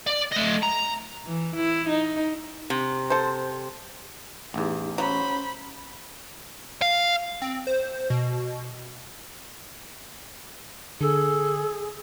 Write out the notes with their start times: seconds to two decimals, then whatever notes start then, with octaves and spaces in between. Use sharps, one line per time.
0.07 D5
0.32 A3 D#5
0.62 A#5
1.26 E3
1.56 E4
1.89 D#4
2.70 C3
3.10 A4 C5
4.54 A1 E2 D#4 G4
4.98 F#3 C#4 C5 B5
6.82 F5
7.42 C4
7.67 C5
8.10 B2
11.01 D3 G#4 A4